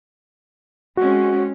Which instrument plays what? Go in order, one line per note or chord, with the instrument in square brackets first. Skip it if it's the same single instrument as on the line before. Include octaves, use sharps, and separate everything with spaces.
[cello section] G#3 C4 C#4 [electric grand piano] F#4